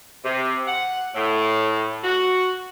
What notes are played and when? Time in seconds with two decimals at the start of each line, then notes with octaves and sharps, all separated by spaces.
0.24 C3
0.66 F#5
1.14 A2
2.04 F#4